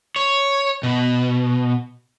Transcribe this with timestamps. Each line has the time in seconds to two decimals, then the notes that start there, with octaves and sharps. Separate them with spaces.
0.16 C#5
0.83 B2